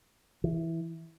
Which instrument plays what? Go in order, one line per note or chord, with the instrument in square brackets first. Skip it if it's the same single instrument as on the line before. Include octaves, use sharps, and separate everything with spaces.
[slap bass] E3